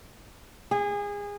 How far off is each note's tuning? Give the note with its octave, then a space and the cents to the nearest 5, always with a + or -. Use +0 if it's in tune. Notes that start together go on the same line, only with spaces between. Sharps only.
G#4 -25